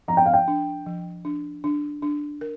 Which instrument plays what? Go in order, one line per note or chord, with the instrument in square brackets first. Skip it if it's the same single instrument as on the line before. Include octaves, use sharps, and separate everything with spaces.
[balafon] F3 [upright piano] A#5
[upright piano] G5
F5
G5
[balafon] D4
F3
D4
D4
D4
A#4